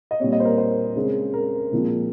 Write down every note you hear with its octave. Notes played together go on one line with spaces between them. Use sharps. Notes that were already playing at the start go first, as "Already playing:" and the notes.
D#5
A#2 G3 C4 C#5
D#5
C5
A#4
C5
C#3 G#3 C4
A#4
A#2 F3 G#3 C4